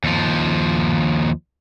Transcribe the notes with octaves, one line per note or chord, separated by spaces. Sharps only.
D#2 F3